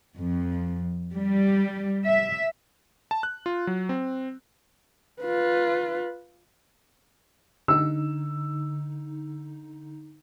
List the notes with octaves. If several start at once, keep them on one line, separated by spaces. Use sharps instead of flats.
F2
G3
E5
A5
F#6
F4
F#3
C4
F4 B4
D3 D#4 E6